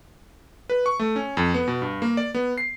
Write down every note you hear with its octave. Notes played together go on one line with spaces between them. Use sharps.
B4
C#6
A3
C#4
F2
B3
B2
G2
A#3
D5
B3
C7